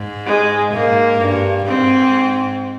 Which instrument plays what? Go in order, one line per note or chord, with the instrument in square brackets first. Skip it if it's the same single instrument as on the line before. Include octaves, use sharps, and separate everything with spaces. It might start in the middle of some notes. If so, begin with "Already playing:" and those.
Already playing: [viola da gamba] G#2
[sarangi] G#3
[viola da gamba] G#2 [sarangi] A#3
[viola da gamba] G2
[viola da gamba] G#2 [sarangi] C4